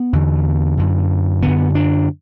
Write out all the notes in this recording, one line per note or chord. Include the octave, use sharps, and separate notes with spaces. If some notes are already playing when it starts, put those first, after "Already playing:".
Already playing: B3
E2 D3
F#2 D3
F#2 D3 B3
D4